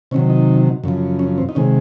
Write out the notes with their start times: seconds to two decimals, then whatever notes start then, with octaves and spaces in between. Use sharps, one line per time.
0.11 C3 D#3 F#3 C#4
0.30 D#4
0.84 F#2 C#3 F3
1.19 C#4
1.38 C4
1.49 D#4
1.55 C3 D#3 G#3 C#4